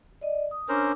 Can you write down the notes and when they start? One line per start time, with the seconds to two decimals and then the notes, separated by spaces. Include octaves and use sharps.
0.21 D5 D#5
0.51 D#6
0.69 C#4 D4 A#4 C5 D6 E6